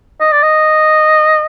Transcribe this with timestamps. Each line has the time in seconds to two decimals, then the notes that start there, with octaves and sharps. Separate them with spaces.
0.20 D#5
0.32 D5
0.43 D#5